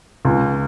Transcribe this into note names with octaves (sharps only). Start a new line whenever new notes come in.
C#2